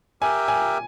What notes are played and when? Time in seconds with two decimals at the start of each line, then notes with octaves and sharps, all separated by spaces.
0.22 G4 A#4 E5 G5 G#5
0.48 G#5